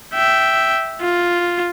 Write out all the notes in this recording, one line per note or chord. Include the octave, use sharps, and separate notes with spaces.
E5 G5
F4